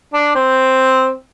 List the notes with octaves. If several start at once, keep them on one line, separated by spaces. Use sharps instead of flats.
D4
C4